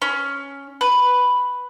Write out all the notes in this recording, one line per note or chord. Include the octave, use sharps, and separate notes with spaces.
C#4
B4